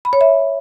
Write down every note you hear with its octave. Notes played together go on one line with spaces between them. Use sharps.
B5
C#5
E5